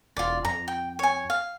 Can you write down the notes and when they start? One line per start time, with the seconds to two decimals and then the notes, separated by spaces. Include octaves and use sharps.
0.17 E1 F4 D5
0.45 F2 A#5
0.68 G5
0.99 C#5 G#5
1.30 F5